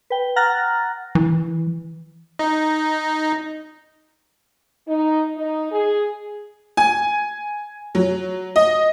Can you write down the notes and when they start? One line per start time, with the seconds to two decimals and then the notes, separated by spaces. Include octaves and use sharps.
0.10 B4 G5
0.36 F#5 A#5 F6 F#6 A6 A#6
1.15 E3
2.39 D#4
4.88 D#4
5.36 D#4
5.72 G#4
6.77 G#5
7.95 F#3
8.56 D#5